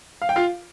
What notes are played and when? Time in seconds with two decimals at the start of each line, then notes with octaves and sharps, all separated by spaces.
0.22 F5
0.29 G5
0.36 F4 F5